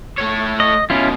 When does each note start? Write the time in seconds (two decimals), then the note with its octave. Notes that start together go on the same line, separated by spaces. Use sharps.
0.18 A3 C#5
0.60 D#5
0.90 F#2 B2 C#4 E4 F4